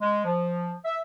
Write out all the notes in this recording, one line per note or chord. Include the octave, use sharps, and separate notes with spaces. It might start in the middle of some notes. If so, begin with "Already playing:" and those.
G#3
F3
E5